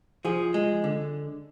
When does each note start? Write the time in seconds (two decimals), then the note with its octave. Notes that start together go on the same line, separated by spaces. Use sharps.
0.25 F3 G#4
0.54 G#3
0.84 D3